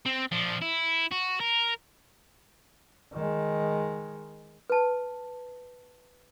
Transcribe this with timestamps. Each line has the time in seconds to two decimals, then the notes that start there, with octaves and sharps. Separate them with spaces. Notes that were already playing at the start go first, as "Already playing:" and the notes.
0.06 C4
0.32 F3 D4
0.62 E4
1.12 F#4
1.40 A#4
3.13 D#3 G#3
4.70 B4 A5